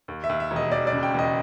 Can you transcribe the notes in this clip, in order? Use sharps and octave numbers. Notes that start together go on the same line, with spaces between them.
D#2
E5
D#2
E5
E1
D#5
E1 D5
D5
C#3
G5
E1 D#5